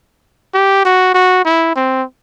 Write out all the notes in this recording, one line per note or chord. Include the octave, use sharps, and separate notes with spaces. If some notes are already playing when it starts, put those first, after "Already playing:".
G4
F#4
F#4
E4
C4